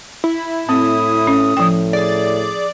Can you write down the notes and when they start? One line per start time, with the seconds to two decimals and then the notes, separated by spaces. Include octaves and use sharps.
0.24 E4
0.69 A2 C4 D#6
1.27 C#4
1.57 A2 F3 G5
1.93 G#4 D5